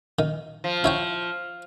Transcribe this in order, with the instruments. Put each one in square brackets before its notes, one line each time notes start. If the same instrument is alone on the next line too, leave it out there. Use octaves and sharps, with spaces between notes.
[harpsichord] D#3
[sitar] F3
[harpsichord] E4 C#5 G5